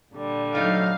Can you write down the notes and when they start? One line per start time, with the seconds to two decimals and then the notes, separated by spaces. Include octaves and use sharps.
0.13 A#2 D3 G3
0.55 F#3 A3 D#4 F5